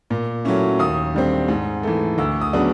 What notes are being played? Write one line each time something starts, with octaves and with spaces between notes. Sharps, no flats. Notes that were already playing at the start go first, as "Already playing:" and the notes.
A#2
F#3 A3 C#4 E4
D#2 D#6
D3 G3 C4
G#2
E3 A3
D2 E6
D#6
C#3 F#3 B3 D4